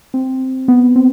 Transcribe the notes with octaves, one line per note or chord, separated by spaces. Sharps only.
C4
B3
C4